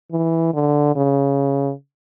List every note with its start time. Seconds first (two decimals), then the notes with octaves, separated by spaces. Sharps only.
0.11 E3
0.54 D3
0.96 C#3